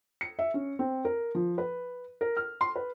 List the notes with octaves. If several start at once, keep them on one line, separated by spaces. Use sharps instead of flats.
C#7
E5
C#4
C4
A#4
F3
B4
A#4
F6
C6
B4